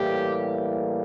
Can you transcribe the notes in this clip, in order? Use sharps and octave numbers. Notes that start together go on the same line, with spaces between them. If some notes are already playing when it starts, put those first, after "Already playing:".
Already playing: A2 E3 G3 A#3 G4